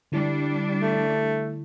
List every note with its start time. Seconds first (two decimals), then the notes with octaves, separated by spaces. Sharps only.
0.12 D3 G3 D4 E4
0.82 A3